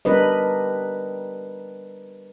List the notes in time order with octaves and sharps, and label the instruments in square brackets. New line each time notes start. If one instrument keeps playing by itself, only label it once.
[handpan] G3 D4 A#4 B4 D#5